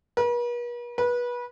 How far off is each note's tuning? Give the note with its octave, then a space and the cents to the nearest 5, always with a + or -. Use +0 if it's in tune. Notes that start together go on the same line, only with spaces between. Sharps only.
B4 -45
B4 -25